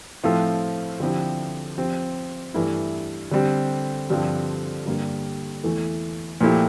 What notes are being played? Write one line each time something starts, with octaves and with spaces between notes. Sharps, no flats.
A2 F3 C4 F4 A4
D3 F3 C4 E4 G4
F3 C4 G4
G2 E3 A3 E4
D3 G3 C4
G2 D3 F3 C4 F4
G2 D3 G3 A#3
E2 E3 A3
A#2 F3 A3 E4 G4